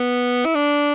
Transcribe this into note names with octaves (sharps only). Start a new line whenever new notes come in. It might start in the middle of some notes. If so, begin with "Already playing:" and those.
Already playing: B3
E4
D4